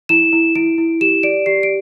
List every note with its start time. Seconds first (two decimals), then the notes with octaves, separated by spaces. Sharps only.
0.09 E4 E7
0.33 E4
0.55 E4 D7
0.78 E4
1.01 G4 E7
1.23 D5 D7
1.46 G4 C7
1.63 D7